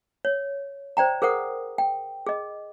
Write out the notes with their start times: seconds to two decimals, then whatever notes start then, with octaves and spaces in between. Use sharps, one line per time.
0.25 C#5
0.97 C5 D5 G5 A#5
1.22 G#4 A#4 C5 F#5 D#6
1.78 G5
2.27 G#4 D#5